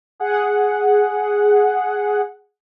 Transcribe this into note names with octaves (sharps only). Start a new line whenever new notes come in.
G#4 F#5